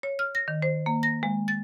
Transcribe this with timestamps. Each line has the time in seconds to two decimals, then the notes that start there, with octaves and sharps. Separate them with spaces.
0.03 C#5
0.19 F6
0.35 A#6
0.48 D#3
0.62 C5
0.86 A#3
1.03 A#6
1.23 G#3
1.48 A6